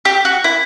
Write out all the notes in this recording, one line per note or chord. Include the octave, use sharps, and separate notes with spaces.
G4
F#4
E4